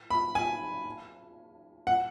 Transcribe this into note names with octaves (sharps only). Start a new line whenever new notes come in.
B5
G#5
F#5